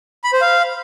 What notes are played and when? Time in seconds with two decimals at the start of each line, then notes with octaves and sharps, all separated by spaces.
0.24 B5
0.33 C5
0.41 F5